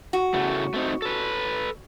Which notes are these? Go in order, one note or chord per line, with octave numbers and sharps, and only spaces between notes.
F#4
A2 C#3 A3
A3 C4 D#4
A4 B4